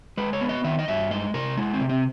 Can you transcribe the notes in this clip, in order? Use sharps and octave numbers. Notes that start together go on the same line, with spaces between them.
G#3 B4
C#5
B3
D#5
D#3 E5
D#5
G2 E5
G#3 D#5
C3 A#4
G#3 E4
C4
C3
C4